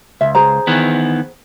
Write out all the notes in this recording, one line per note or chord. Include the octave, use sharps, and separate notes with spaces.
C#2 E5
G#4 C5 A#5
D#3 E3 B3